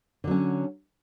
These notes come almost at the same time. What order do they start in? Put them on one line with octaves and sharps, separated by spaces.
D3 F#3 C#4